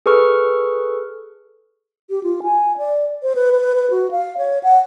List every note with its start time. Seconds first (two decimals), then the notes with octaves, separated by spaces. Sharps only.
0.06 G#4 A4 B4 C#6 F6
2.10 G4
2.23 F4
2.43 G#5
2.78 D5
3.23 C5
3.35 B4
3.52 B4
3.75 B4
3.91 F#4
4.11 F5
4.38 C#5
4.63 F#5